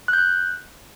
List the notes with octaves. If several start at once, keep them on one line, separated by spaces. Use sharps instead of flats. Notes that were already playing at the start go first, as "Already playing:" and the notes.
F#6
G6
F#6